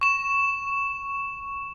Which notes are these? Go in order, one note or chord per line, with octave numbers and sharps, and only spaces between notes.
C#6 E7